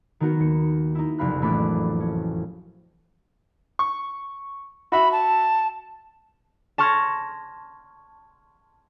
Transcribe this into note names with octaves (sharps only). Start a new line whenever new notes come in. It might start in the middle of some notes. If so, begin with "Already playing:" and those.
D#3 B3 D#4 F#4 A#4
D#2 C#7
D#4 E4
F#1 C2 F2 F5 B5 F#6
A1 A3 A#3 D4 B5 D6
C#4
C#6
F#4 E5 B5
A5
A5 C6 C#6 F6 G#6 A#6